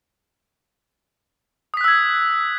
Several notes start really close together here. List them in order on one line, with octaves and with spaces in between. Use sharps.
D#6 B6 F#6 E6 G#6